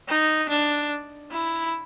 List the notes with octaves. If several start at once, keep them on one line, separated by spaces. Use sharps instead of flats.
D#4
D4
E4